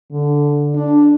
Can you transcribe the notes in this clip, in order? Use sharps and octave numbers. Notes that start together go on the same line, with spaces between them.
D3
D4